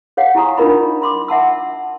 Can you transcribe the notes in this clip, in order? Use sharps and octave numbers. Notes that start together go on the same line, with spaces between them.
G#4 C#5 F5 F#5
E4 G4 G#5 A#5 C#6 D#6
D4 D#4 F4 A#4 D#5 B5
B5 C6 D6
E5 F#5 A5 E6